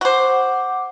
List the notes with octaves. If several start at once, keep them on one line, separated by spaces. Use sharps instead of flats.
F#4 C5 F#5 D6